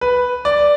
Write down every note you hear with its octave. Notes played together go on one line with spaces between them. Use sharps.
B4
D5